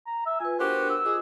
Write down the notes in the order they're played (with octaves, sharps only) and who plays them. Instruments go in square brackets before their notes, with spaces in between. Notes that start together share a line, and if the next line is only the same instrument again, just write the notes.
[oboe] A#5
E5
[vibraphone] F4 B4 [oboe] G#5
[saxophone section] B3 G4 C5 [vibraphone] D4 A#4 [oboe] F#4
[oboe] E6
[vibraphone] F4 D#5 D6 [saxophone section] G#4